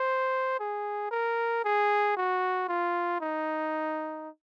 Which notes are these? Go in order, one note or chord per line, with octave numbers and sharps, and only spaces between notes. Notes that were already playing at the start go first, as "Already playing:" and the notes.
Already playing: C5
G#4
A#4
G#4
F#4
F4
D#4